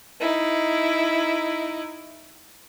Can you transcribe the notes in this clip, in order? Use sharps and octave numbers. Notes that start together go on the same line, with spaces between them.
D#4 E4